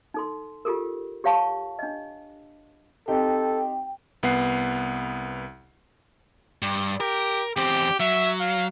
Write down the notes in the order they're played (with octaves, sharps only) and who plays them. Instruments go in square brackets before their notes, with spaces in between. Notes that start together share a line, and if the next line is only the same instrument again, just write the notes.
[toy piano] D#4 A4 C6
F4 G4 A4 A#4
G4 C#5 F5 A5 C#6
D4 D#5
[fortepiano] C4 D#4 G4 [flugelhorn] A4 [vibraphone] G5
[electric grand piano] C2 B3 F#5 C7
[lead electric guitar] G2
[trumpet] G4 [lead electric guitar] A#4
[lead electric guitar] E2 C4 [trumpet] G4
[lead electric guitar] F#3 [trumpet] E5
[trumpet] F5